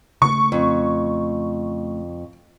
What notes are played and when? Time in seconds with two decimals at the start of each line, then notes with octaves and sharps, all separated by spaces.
0.22 C#3 A3 C#6
0.52 F2